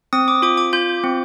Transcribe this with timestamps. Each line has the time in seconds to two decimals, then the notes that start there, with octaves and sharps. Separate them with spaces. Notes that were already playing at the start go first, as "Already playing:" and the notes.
0.13 C4 D#6
0.28 D6
0.42 F4 D6
0.57 D6
0.73 F4 G6
1.04 C4